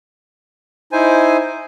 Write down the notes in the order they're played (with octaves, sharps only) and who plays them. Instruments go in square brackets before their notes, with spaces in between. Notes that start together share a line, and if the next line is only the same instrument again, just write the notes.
[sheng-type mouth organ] D#4 E4 C5 G#5